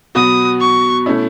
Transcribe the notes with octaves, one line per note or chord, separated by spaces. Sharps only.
B2 F#3 B3 F#4 D#6
C#6
B2 A3 C#4 E4